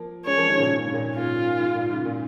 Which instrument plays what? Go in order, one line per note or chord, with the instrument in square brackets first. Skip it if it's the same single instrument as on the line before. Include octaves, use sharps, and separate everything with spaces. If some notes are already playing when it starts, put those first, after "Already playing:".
Already playing: [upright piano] F3 A#3
[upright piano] G#3 C#4 [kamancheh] C#5
[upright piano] F3 A#3
D#3 G#3
C#3
A#2
G#2
C#3
A#2
[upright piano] G#2 [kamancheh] F4
[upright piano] G#2
A#2
G#2 C#3
A#2